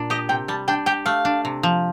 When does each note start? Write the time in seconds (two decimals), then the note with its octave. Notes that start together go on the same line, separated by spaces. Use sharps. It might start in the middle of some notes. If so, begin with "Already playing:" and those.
Already playing: A#2 D4
0.10 G4 D#5
0.29 C3 G5
0.48 G3 A5
0.68 D4 G5
0.86 G4 G5
1.06 A3 F5
1.25 D4
1.45 C3
1.63 F3